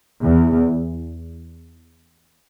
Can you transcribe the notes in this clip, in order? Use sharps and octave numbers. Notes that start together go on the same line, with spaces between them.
E2